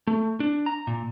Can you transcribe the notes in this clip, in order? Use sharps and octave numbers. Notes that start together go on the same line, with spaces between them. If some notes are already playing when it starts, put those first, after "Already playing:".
A3
D4
A#5
A#2